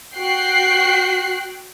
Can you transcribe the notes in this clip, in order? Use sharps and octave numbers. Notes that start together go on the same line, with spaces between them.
F#4 G5 F#6 C7